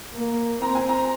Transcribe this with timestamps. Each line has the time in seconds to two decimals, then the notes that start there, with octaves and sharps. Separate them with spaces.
0.14 A#3
0.61 C4 A#5
0.75 G#5
0.89 A#5